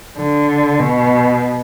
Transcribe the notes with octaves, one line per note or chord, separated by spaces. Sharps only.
D3
B2